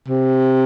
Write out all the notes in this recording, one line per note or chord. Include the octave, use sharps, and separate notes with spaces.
C3